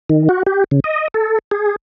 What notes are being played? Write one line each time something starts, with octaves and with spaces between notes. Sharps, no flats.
D#3
F#4
G4
C#3
D#5
A4
G#4